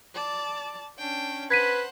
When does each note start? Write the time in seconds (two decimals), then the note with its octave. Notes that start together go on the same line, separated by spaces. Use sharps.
0.15 D5 A5
0.98 C#4 D4 G5
1.50 B4 C5 F#5 G#6 B6 D#7